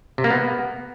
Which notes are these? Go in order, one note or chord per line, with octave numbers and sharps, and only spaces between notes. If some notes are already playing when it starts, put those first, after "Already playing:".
C3
A#3
B3